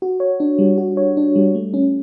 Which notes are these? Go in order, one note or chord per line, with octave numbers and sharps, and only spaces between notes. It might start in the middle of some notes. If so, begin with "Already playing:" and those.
F#4
C#5
D4
G3
F#4
C#5
D4
G3
A3
C#4